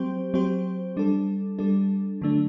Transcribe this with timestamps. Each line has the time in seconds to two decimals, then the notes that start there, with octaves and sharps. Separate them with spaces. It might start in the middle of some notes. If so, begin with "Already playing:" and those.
Already playing: F#3 C4 G4 C5
0.34 F#3 C4 G4 C5
0.97 G3 D4 A4
1.59 G3 D4 A4
2.21 D3 F#3 A3 D4